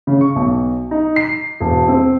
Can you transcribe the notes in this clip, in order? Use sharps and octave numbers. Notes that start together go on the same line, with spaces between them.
C#3
C#6
B1
D#4
C7
E1
C4